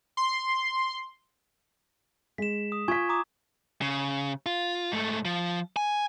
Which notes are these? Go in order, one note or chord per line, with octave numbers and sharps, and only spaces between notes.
C6
G#3 B6 E7
D#6
F4 G#5 C#6 G#6 B6
A#5 D6 D#6
C#3
F4
G#2 A3
F3
G#5